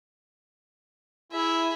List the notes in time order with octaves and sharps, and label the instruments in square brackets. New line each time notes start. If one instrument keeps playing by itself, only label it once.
[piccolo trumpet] E4 [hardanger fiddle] G#4 E5